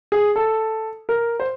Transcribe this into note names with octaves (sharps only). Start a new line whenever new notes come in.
G#4
A4
A#4
C5